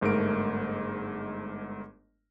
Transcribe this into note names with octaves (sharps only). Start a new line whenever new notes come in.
G1 G#2 A3 A#4 D7